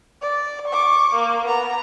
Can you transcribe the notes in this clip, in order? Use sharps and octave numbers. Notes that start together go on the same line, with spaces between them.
D5
C#6 D6
A#3
B3 A#5